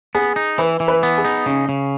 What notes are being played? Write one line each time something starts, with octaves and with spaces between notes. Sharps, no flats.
B3 G#4
D#4
E3 B4
E3
B4
B3
G#4
D#4
C#3 C#4
C#3